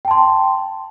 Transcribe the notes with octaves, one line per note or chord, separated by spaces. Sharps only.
G5 A5 C6